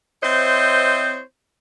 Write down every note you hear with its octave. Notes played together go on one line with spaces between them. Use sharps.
C4 E4 C5 C#5 D#5